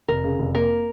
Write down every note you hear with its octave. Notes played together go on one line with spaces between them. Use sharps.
F1 A#4
C#3
F1
A#3 A#4